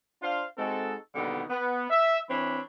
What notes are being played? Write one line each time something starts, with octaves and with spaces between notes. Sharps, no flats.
D4 F4 C5 F5
G#3 C4 D#4 F#4 A4
B2 D3 D#3 G3 A#3 B3
B3
E5
E3 C4 D4 C#5 B5